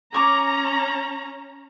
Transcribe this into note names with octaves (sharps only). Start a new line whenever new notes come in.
C#4 A#5 C#6 D6